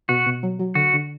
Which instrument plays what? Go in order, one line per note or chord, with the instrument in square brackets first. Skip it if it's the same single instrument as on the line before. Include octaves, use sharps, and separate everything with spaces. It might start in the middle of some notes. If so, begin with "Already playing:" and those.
[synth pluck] B2 [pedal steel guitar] F#4
[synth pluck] B2
F#3
F#3
[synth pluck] D3 [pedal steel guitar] F#4
[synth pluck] D3